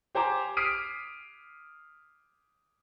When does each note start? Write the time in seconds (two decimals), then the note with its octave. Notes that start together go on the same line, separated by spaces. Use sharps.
0.15 G4 C5 G#5 A#5 D6
0.57 D#6 F6 B6 C7 D7 D#7